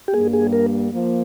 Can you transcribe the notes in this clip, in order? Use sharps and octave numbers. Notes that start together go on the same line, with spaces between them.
G4
G2 G3 A#3 G#4
G#4
A#4
F3 A#3